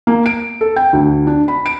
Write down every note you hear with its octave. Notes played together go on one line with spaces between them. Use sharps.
A#3
D7
A4
G5
D2
D4
B5
D7